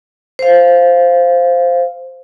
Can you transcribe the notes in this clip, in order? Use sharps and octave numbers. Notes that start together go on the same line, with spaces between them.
C5 F5